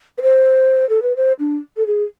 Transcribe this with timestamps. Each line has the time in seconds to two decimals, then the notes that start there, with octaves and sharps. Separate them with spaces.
0.18 B4
0.22 C5
0.89 A4
1.02 B4
1.16 C5
1.39 D4
1.77 A4
1.87 G#4